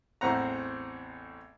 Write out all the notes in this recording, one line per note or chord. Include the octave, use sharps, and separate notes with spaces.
A1 E2 C4 F#5 A#5